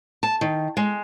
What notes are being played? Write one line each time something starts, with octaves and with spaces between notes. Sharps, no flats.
A5
D#3
G#3